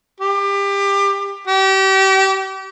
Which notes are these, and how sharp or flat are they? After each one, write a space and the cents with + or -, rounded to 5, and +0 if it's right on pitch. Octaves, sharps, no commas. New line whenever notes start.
G4 +25
G4 -30